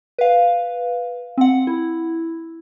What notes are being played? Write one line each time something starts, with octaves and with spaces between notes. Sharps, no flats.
B4 F5
C4 F#5
E4